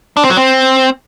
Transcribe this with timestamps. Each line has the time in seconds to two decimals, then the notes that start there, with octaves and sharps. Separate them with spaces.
0.17 D4
0.23 C4
0.30 F#3
0.37 C4